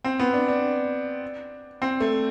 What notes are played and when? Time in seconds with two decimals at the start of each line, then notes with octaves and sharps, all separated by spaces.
0.04 C4
0.19 B3
0.33 D4
0.48 D4
1.82 C4
2.00 A3